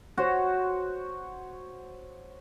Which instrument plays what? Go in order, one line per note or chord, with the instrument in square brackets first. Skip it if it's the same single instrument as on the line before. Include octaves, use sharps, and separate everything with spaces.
[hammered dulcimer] F#4 C5 C#5